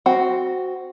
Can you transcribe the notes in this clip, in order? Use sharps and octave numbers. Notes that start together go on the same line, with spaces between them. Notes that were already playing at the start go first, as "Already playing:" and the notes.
C4 F#4